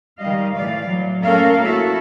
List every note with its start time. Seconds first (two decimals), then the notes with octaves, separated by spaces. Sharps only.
0.19 D#3 G3 D#5 F5
0.54 A2 E3 D5 F5
0.86 F#3
1.24 A3 A#3 C#4 A4 A#4 F5
1.65 E4 F#4 A4 E5